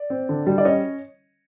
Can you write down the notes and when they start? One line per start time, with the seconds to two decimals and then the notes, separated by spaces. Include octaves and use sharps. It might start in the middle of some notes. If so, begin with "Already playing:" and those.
Already playing: D5
0.10 C4
0.29 D3
0.47 G3
0.58 D5
0.65 C#4 C#5 D#5